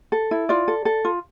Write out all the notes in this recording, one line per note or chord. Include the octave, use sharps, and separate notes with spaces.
A4
E4
F4 D5
A4
A4
F4